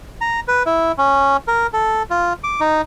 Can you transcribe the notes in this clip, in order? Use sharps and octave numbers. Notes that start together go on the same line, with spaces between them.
A#5
B4
E4
C#4
A#4
A4
F4
D6
D#4